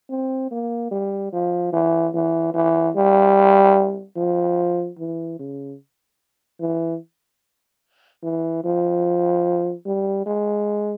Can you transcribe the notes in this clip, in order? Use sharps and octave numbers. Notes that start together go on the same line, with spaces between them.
C4
A#3
G3
F3
E3
E3
E3
G3
F3
E3
C#3
E3
E3
F3
G3
G#3